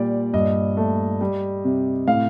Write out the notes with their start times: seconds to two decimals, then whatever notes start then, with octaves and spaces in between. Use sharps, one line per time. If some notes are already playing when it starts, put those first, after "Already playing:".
Already playing: A#2 G3 D5
0.34 G2 D#5
0.77 A3
1.21 G3
1.64 C3
2.08 A2 F5